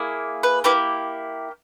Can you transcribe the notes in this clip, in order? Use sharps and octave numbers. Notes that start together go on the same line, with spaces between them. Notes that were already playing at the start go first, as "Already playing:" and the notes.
Already playing: A#3 E4 G#4
B4
A#3 E4 G4 B4